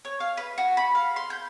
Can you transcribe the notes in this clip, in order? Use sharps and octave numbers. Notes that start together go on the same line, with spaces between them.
C#5
F5
B4
F#4
B5
F5
C6
G6